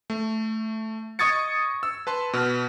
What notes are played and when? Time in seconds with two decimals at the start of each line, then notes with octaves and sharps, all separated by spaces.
0.10 A3
1.19 D#5 C#6 D#6 G#6 A6 C#7
1.83 E6
2.07 B4 A5 C6
2.33 B2 B4 F6